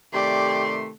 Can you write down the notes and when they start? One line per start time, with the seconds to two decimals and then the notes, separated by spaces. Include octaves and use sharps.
0.14 C3 D#3 A3 G4 D5 C6